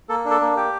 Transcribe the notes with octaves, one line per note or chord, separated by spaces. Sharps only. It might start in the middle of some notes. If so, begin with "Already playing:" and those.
A#3 A4
D4
A4
A#3
G4